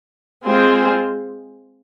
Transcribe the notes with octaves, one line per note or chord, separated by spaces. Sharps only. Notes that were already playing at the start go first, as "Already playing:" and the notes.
G#3 C4 F4 G#4 C5